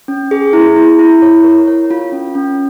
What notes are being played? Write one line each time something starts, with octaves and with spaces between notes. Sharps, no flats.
C#4
G#4
E4
E4
E4
C#5
A#4
C#5
F4
C#4
C#4